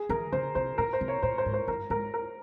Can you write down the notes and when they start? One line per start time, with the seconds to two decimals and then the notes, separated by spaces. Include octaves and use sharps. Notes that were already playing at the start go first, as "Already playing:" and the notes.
Already playing: G#4
0.09 E3 A#4
0.32 C#3 C5
0.55 C3 C5
0.78 A#2 A#4
0.93 C5
1.01 C3
1.08 C#5
1.23 A#2 C5
1.38 C5
1.46 G#2
1.54 C5
1.68 G2 A#4
1.90 G#2 A#4
2.14 A#4